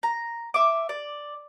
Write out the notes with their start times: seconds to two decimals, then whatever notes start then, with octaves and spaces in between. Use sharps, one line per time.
0.03 A#5
0.54 E5 D6
0.89 D5